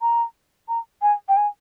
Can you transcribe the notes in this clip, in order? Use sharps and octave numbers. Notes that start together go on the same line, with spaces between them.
A#5
A#5
G#5
G5
G#5